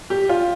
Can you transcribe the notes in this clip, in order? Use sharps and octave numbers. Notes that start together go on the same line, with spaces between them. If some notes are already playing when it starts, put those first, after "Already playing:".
G4
F4